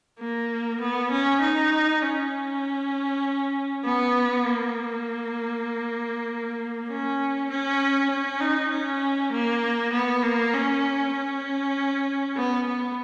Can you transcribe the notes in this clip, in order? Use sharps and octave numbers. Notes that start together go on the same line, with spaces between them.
A#3
B3
C#4
D#4
C#4
B3
A#3
C#4
C#4
C#4
D#4
C#4
A#3
B3
A#3
C#4
C#4
B3
B3